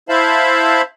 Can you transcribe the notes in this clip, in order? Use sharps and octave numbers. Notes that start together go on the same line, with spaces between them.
E4 C5 E5 F5 A5 B5